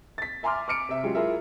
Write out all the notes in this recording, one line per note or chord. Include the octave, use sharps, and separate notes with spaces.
A6 B6
E5 G#5 A#5 C6 D6 F6
D6 F6 C#7 D7
C3 E5
F#3 G#3 C#4 F4 G4
E4 F4 G#4 A#4 E5